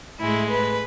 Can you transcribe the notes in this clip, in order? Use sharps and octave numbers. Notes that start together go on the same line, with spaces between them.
A2 G#3 E4
B4